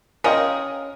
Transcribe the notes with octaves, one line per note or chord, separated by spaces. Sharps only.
C#4 F4 G#4 A#4 D#5 G5